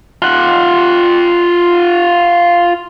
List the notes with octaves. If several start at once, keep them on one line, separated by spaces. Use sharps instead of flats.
F4 F#5